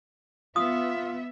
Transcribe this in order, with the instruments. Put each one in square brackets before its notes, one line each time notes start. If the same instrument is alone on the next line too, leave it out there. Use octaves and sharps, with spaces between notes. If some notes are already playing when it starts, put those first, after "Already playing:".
[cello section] B3 E5 [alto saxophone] F4 [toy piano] D#6